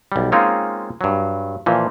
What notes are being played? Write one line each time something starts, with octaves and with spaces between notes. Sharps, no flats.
B1 G3
G#3 A#3 C4 C#4 D#4 F4
G2 F#3
A#2 E3 F3